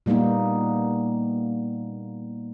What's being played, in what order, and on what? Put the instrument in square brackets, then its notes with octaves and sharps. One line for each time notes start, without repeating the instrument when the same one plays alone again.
[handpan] A#2 G3 A#3 B3 D#4